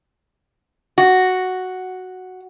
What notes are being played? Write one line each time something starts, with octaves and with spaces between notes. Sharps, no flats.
F#4